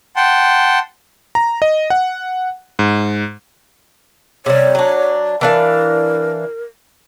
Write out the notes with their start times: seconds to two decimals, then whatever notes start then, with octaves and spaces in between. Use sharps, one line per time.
0.16 F#5 G5 A5 C6
1.35 A#5
1.62 D#5
1.90 F#5
2.79 G#2
4.46 C3 G3 C#5
4.75 F#3 D4
5.41 E3 D4 A#4 F5